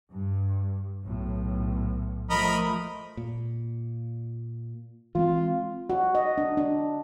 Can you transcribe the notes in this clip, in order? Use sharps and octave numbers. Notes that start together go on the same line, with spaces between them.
G2
B1 A2
F3 A3 A#4 D#5 B5
A#2
E3 G#3 C4 F4
F#4
D#5
D4
D4